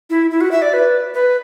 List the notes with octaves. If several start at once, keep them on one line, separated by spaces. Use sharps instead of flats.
E4
E4
F#4
E5
D5
B4
B4